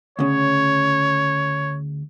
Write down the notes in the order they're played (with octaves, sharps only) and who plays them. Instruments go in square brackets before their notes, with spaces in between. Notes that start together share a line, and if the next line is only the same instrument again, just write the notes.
[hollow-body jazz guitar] D2 C#3 [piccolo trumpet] C#5